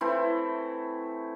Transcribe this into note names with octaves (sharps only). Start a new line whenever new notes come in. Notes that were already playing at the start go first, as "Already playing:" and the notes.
E3 A3 C4 E4